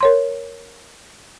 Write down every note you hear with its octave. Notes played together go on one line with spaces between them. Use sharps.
A#4 C#5 C6